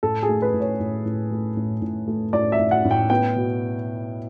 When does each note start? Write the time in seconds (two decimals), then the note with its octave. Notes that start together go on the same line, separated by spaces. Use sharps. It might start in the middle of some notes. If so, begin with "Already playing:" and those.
0.03 A2 A4
0.23 G#4
0.29 A3
0.42 B4
0.54 A2
0.60 C#5
0.80 A2
1.05 A2
1.31 A3
1.57 A2
1.82 A2
2.08 A3
2.33 A2 D5
2.52 E5
2.59 A2
2.71 F#5
2.85 A2
2.91 G5
3.10 B3 G5
3.36 B2